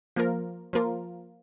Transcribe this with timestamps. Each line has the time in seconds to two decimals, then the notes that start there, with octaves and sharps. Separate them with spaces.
0.16 F3 A#3 F4 A#4
0.73 F3 A#3 F4 A#4